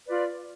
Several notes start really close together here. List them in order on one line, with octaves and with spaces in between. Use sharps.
B4 D5 F4